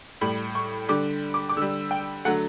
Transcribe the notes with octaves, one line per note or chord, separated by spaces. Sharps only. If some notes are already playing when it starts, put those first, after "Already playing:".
A2 G3 B5
C#6
D3 G3 D6
D6
D6
D3 G3 E6
G5
D3 F#3 A3 F#5